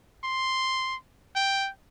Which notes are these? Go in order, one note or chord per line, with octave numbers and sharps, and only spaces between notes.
C6
G5